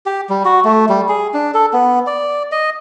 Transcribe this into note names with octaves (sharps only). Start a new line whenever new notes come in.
G4
G3
F#4
A3
G3
G#4
D4
A4
B3
D5
D#5